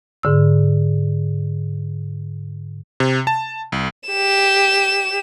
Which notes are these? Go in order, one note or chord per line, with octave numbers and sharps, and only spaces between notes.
G#2 D3 E6
C3
A5
C2
G4 E7